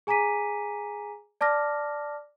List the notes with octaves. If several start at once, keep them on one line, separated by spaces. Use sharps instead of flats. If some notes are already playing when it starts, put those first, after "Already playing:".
G#4 G#5 A#5 D6 B6 D#7
D5 A5 D6 F6 A#6